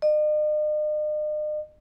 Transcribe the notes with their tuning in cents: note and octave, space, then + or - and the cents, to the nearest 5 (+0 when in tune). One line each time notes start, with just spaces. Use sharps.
D#5 -45